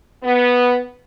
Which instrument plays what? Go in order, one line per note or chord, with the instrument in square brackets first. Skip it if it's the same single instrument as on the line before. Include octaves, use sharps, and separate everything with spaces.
[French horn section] B3